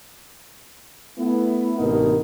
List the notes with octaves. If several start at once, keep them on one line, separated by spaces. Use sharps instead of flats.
A3 B3 E4
A1 C3 A#3 B3 D#4 A#4